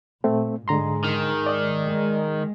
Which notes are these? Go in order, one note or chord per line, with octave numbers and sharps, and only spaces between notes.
A#2 A3 C4
G#2 D3 G#3 A#5 C6
D#3
D5 D#5
G#3